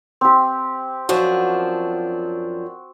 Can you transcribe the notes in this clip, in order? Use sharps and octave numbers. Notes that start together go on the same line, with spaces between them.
C4 G4
F#2 F3 D4 F#4